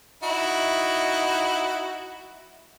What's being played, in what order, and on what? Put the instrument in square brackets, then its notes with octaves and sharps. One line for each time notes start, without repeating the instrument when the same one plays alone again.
[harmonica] D#4 E4 F#4